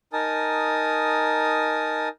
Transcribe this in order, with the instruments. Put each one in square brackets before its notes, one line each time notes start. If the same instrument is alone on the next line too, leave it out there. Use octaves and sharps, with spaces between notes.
[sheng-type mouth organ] D#4 A#4 G#5 A5 D#6